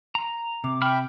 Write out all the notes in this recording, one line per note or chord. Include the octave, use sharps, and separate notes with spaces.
A#5
C3 D6
E5 G5 B5 F6